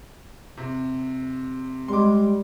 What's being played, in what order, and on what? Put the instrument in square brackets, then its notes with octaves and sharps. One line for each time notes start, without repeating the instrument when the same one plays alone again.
[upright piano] C3
[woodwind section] G3 G#3 [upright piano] C6 D6